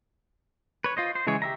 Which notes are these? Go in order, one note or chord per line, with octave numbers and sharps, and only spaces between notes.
B4 C#5
F4 C5 D#5
C5
C#3 E3 G#3 G#4 C#5
G4 E5 A#5